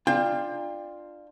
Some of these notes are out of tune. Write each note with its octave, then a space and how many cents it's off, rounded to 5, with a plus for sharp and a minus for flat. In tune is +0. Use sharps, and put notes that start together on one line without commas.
D4 +20 F4 +0 G5 +30